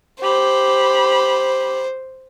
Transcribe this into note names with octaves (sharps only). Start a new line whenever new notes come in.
G4 C5 B5